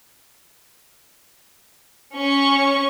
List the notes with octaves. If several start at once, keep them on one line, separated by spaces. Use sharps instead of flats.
C#4 C#6